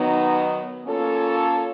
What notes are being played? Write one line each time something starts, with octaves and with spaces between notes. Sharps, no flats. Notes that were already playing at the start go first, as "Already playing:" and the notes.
Already playing: D#3 F#3 B3 D#4
A#3 C#4 F4 A4 C#5